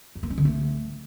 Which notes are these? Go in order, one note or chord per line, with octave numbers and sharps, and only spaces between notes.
E3
A#3
C#4
D3
A3